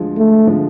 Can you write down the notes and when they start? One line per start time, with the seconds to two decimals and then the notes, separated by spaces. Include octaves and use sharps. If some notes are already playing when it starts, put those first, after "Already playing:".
Already playing: D2 D3 F3 G#3
0.17 A3
0.46 D3 F3 G#3